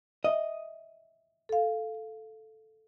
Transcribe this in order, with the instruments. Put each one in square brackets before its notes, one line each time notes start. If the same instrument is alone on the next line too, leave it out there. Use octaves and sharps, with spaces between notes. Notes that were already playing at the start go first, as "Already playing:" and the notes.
[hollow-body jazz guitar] D#5 [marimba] E5
[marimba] A4 F5